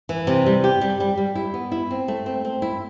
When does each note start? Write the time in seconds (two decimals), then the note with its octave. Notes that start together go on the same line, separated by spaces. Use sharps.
0.09 E3
0.27 C3
0.46 G3
0.64 G4
0.81 G3
1.00 G3
1.17 G3
1.35 E4
1.54 B3
1.72 E4
1.91 C4
2.08 A3
2.26 C4
2.45 C4
2.62 E4